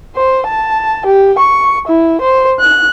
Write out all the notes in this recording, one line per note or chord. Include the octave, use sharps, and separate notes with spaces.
C5
A5
G4
C#6
E4
C5
F#6